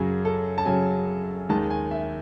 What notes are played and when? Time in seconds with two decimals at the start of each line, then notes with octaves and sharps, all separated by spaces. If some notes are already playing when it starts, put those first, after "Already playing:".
Already playing: F#2 C#3 F#3 G#4
0.25 A4
0.58 A5
0.65 F#2 C#3 F#3 G#5
1.49 D#2 D#3 G#3 A5
1.70 G#5
1.91 E5